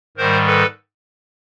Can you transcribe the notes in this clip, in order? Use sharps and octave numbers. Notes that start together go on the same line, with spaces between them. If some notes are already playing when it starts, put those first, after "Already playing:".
G#2 D#3 G3 A#4 C5
A4 B4